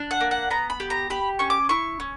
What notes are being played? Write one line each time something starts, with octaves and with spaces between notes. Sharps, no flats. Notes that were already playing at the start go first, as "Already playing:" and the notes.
Already playing: D4
F#5
A#3
F#5
B3 A#5
B5
G4
A#5
G4 B5
C#4 C#6
D6
E4 C#6
C#4